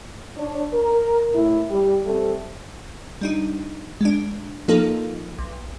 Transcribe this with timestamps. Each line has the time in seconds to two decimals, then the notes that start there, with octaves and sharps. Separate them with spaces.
0.38 D4 C#5
0.73 A#4
1.33 A2 E4
1.70 G3
2.05 G3 A3 C4
3.21 G3 D4 D#4
4.01 G#3 D4
4.68 F3 A#3 D#4 F4 A4
5.39 B1